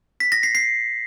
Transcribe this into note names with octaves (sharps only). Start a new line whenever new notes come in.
B6
A#6
C7
C7